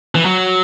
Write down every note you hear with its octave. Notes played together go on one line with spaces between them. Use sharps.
E3
F#3